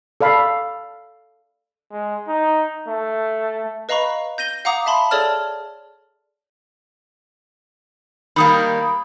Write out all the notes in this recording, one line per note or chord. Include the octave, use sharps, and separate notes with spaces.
A4 D5 F5 B5
G#3
D#4
A3
B4 D#5 F5 A#5 B5 C#6
G6 A#6 D#7 G7
F5 F#5 A#5 D6 D#6
E5 A5 B5 C6
G#4 A4 C#5 D5 A5 F6
D#3 G3 A#3 B5 D#6